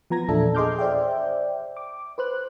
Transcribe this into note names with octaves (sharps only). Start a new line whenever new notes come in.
F3 B3 A#5 G#6 A#6
E2 A#2 D4 A4 E5
G#4 D#5 C6 D6 F6 G6
C5 D5 E5 G5
D6
B4 C5 F#6